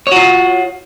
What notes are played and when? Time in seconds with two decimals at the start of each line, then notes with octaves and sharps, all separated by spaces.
0.07 C#5
0.12 F#4
0.16 F4